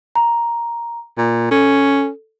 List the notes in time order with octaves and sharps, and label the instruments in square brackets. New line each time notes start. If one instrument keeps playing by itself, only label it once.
[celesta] A#5
[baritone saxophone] A#2
[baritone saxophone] C#4 [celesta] A4